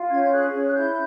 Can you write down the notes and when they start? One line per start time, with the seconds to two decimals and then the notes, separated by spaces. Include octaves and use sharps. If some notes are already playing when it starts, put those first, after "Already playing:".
Already playing: F4
0.11 C#4 G#6
0.21 G6
0.32 G#4 F#6
0.53 C#4
0.67 F#6
0.74 E4 G6